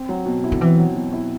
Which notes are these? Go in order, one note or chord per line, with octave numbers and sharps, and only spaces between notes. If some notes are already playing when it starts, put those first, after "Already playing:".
Already playing: C4
F#3
B2
E4
D3
E3 C4
F#3
B2
E4